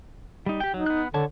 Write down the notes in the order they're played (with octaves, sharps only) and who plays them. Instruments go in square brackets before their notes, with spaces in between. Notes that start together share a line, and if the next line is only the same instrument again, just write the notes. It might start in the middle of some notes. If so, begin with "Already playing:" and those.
[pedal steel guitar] G3 D#4
G4 G5
[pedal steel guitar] F#3 [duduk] D#4
[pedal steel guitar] B3 F#6
[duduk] D3 [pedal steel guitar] C#5 A5